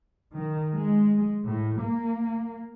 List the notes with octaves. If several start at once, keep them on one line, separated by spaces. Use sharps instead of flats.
D#3
G#3
A2
A#3